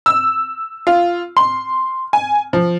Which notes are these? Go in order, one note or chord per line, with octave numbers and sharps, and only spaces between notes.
E6
F4
C6
G#5
F3